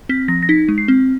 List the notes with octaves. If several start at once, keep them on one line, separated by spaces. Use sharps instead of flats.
C4 B6
F3 A#6
A#6
D#4 B6
G#3
C7
C4